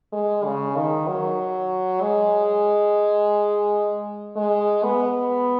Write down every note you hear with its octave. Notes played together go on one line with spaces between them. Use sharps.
G#3
C#3
D#3
F#3
G#3
G#3
B3